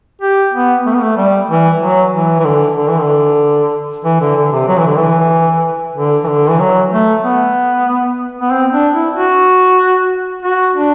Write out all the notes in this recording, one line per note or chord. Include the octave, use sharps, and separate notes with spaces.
G4
B3
A3
B3
A3
G3
E3
F#3
E3
E3
D3
D3
E3
D3
E3
D3
D3
C3
F#3
E3
D3
E3
D3
E3
D3
E3
F#3
A3
B3
B3
C4
D4
E4
F#4
F#4
D4